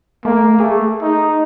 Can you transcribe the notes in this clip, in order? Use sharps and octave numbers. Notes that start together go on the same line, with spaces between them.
A3 A#3
A3 G#4
D#4